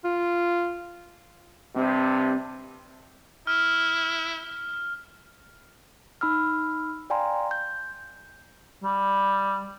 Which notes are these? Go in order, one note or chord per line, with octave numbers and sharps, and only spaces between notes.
F4
G2 C3 C4
E4 F6
D#4 B5 E6 F6
D5 F5 G5 G#5 A#5 C6
G6
G3